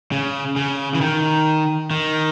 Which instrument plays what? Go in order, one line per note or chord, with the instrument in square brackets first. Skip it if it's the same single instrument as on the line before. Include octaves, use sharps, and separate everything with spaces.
[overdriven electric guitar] C#3
C#3
E3
D#3
D#3